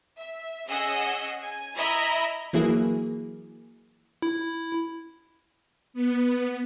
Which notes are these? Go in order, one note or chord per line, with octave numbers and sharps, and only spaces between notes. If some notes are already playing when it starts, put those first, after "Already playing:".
E5
C#4 G#4 D#5 F#5 E6
G#5
E4 D#5 E5 A#5 B5
E3 F#3 A#3 E4 G#4
E4
B3